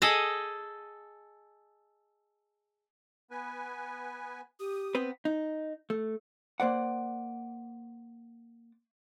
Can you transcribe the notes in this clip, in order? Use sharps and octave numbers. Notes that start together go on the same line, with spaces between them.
G#4 A4 D#5
B3 B4 G#5
G4 D#6
B3 C4 B4
D#4
A3
A#3 C5 D5 F#5